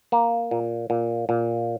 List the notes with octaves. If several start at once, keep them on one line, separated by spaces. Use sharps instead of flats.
A#3
A#2
A#2
A#2